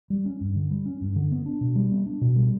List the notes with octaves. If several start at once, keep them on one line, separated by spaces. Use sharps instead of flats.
G3
C#4
G2
D3
G3
C#4
G2
D3
B3
D4
B2
G3
B3
D4
B2
G3